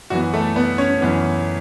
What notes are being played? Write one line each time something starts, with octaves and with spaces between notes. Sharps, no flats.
F#2 E3 B3 F#4
A3 A4
B3 B4
C#4 C#5
F#2 E3 B3